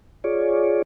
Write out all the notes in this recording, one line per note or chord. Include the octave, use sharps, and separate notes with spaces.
F4 G#4 C#5 D5